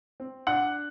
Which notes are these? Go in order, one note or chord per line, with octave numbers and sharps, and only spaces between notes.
C4
D4 F#5 F#6